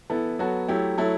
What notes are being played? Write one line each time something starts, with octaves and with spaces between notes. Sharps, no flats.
E3 B3 E4 A4
F#3 B3 F#4 A4
F#3 A3 E4 G4
F#3 A3 E4 A4